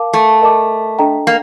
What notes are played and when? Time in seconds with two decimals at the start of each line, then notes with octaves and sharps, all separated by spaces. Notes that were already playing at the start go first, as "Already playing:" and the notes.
Already playing: A#4 F5 A5 D6
0.13 A3
0.42 A#4 D#5 A5 D6
0.99 D4 A4 D#5 G5 A#5
1.27 A#3